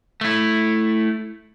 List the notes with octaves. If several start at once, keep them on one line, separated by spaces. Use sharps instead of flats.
A3 E4